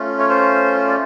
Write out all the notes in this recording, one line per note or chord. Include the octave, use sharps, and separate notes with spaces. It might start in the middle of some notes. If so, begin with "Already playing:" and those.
Already playing: A3 C#4 F4
C#5
C5
D5